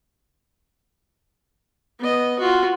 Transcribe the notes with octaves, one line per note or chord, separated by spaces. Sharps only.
B3 D#5
F4 F#4